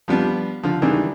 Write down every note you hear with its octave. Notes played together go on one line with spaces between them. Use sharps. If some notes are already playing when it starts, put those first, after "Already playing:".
F3 G3 B3 D4
D3 F3
D#3 E3 G3 G#3 D4